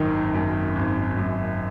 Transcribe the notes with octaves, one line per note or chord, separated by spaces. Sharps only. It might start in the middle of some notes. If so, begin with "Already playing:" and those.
Already playing: G#1 F#2 D#3 D#4
F#2
G#1
F#2